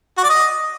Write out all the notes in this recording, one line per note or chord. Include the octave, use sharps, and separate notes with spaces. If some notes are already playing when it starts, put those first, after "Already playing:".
F#4
D5
D#5